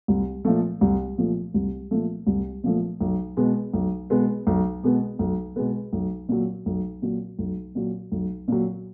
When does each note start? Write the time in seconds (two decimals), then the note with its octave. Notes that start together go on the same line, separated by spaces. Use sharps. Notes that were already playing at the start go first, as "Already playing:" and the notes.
0.08 C2
0.45 A#2 F3 A3
0.81 C2
1.18 A#2 F3 A3
1.54 C2
1.91 A#2 F3 A3
2.27 C2
2.64 A#2 F3 A3
3.01 B1
3.37 B2 G#3 B3
3.74 B1
4.10 B2 G#3 B3
4.47 B1
4.84 B2 G#3 B3
5.19 B1
5.56 B2 G#3 B3
5.93 B1
6.29 A#2 F#3
6.66 B1
7.02 A#2 F#3
7.39 B1
7.75 A#2 F#3
8.12 B1
8.48 A#2 F#3